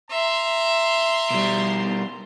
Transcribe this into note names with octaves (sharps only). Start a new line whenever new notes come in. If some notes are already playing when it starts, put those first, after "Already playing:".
E5 A#5 C6
B2 G3